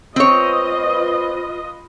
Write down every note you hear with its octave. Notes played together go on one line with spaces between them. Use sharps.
C4 F4 B4 C#5 D#5